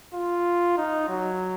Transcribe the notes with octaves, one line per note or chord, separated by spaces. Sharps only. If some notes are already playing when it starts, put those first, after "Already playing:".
F4
D#4
F#3